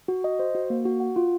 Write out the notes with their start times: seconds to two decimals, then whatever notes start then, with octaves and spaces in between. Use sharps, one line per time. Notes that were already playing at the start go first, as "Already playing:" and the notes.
0.08 F#4
0.24 D#5
0.39 C5
0.55 F#4
0.70 A#3
0.85 F#4
1.00 F#5
1.16 F4